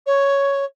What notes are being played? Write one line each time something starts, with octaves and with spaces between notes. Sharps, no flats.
C#5